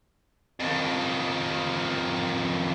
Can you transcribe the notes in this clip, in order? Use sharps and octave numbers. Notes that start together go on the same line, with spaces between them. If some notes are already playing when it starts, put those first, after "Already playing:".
F2 D#3